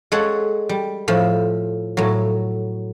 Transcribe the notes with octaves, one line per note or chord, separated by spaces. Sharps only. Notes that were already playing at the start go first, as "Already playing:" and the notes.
G#3 A4 C#5 F#5
G3
A2 F3
A2 F#3